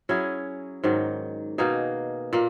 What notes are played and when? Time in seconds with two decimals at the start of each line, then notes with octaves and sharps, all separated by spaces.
0.09 F#3 C#4 E4 G#4
0.84 G#2 D#3 F#3
1.58 B2 A#3 D#4 G#4
2.33 A#2 A#3